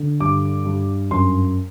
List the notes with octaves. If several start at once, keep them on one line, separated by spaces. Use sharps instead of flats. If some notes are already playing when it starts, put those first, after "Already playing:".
Already playing: D3
G2 D6
G2
F#2 C6